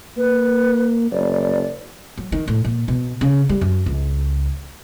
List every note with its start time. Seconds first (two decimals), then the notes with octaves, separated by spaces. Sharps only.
0.17 A#3 B4
1.12 F#1 D5
2.17 F#3
2.32 D#3
2.48 A2
2.65 A#2
2.88 B2
3.21 C#3
3.49 G3
3.61 F#2
3.86 C#2